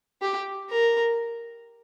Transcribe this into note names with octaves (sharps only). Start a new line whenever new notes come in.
G4
A#4